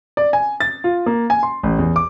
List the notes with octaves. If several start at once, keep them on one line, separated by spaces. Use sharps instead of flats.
D5
G#5
A6
F4
A#3
G#5
C6
A1
E2
D6